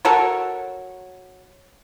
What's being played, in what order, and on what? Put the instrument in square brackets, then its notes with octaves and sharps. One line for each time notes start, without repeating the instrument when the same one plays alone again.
[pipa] F#4 A4 A#4 C#5